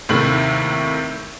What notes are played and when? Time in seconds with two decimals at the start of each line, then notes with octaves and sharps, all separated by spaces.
0.09 D#2 A2 C3 D#3 A3 F#7